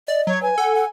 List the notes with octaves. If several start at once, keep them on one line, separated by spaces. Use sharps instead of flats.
D5 D#5
F#3 C#5
B4 G#5
A4 F#5
F#5